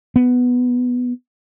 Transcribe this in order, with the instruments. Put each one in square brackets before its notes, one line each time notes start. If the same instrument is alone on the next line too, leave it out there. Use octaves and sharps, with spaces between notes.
[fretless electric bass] B3